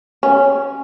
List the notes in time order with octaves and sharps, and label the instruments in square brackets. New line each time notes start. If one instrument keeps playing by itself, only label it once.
[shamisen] C#4